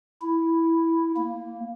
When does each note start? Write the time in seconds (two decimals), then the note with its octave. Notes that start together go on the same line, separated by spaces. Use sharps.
0.21 E4
1.16 A#3